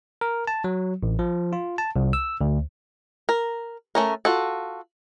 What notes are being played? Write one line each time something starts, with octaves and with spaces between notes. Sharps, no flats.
A#4
A5
F#3
A1
F3
F4
A5
C2
E6
D2
A#4
A3 C#4 A#4
F4 F#4 A4